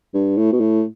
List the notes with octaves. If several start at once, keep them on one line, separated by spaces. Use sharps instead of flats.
G2
A2
B2
A2